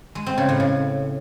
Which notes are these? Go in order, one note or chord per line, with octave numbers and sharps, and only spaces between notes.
G#3
C4
C#3
A2
C#3